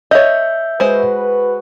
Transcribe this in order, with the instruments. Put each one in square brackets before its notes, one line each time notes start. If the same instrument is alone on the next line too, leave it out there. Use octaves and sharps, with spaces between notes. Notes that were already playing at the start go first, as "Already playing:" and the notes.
[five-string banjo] C#5 D#5 [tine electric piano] E5 G6
[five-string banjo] G#3 C5 [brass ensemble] F#4 B4